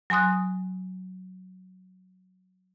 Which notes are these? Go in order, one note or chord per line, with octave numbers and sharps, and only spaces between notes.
F#3 G#5 C6 D#6 F#6